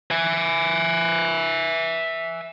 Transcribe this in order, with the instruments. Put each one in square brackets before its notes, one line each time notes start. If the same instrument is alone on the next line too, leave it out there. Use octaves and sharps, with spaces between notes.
[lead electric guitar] E5 G#5